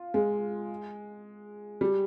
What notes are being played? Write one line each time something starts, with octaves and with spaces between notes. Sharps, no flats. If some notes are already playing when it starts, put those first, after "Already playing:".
Already playing: F4
G#3
G3